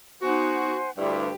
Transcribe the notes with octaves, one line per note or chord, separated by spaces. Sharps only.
B3 D#4 F#4 C5 F#5 G#5
D2 G2 E4 G4 E5